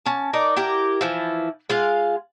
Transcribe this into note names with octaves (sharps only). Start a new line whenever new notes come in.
C#4 A5
D#4 A#4 D5
E4 G4 A#4
E3 F3 E4
G#3 F4 F5